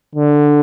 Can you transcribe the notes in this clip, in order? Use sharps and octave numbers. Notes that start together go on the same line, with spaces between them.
D3